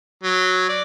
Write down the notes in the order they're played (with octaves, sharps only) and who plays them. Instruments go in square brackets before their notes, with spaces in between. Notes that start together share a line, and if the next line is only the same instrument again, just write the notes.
[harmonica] F#3
D5